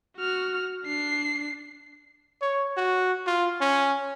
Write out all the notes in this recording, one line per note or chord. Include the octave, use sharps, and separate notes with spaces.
F#4 F6
D4 C7
C#5
F#4
F4
C#4